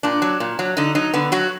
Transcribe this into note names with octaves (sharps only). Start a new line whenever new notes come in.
A#2 D4
F#3
A#2
F#3
D3 D#4
F#3 D#4
D3 B3
F#3 F#4